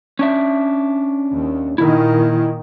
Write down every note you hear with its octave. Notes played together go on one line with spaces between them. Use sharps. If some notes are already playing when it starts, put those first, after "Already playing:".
C#4 D4 E5
D#2
A#2 D#3 E4